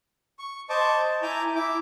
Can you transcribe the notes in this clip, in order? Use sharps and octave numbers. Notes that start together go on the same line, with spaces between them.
C#6
C5 D#5 A5 C#6 D6
A5
E4 G#5 A#5 D6 G6
E4 D6